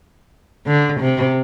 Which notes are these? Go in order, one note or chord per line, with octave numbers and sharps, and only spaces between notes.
D3
C3